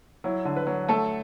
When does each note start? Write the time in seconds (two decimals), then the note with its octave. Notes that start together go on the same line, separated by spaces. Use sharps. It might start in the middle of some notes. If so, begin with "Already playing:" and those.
0.24 F#3 E4
0.45 D3
0.56 B4
0.67 F#3
0.88 A3 A4